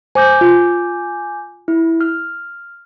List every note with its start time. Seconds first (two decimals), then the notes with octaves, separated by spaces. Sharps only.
0.15 C5 G#5 D6 G6
0.41 F4
1.68 E4
2.01 F6